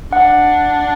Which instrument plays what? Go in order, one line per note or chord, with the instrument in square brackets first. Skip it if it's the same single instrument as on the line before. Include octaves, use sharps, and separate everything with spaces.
[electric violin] D4 [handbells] F#5